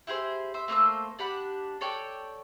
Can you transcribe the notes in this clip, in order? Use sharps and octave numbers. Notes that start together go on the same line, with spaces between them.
E4 G4 G#4 C5
C5 E5
A3 A#3 C5 E6
D4 G4 F#5 B5
A4 C#5 D5 G5